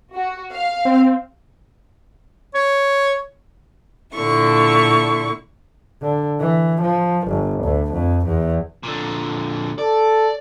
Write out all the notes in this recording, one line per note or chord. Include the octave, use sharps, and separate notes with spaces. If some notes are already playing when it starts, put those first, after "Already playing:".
F#4
F5
C4
C#5
A#2 D3 E4 C#6
D3
E3
F3
G1
D2
F2
E2
A#2 D3
A4 D5